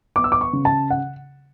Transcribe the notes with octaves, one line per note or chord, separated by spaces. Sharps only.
B3 D6
E6
D6
C#6
C#3
A5
F#5